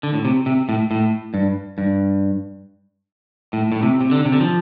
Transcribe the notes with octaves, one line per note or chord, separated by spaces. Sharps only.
D3
A2
C3
C3
A2
A2
G2
G2
A2
A2
C3
C3
D3
C3
D3
F3